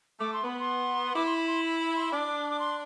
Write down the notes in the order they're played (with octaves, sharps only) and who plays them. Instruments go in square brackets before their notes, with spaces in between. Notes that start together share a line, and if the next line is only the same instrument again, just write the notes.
[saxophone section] A3 [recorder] D6
[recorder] C6
[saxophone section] B3 [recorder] B5
[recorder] C6
[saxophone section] E4 [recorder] D6
[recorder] C6
B5
C6
B5
B5
C6
[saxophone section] D4 [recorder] D6
[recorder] D6
C6